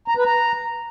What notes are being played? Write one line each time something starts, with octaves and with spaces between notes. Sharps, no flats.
A#5
B4
A#5